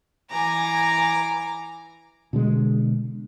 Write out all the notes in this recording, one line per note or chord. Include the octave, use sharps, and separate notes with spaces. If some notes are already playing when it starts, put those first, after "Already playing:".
E3 G#5 A#5 D6
B2 D3 G#3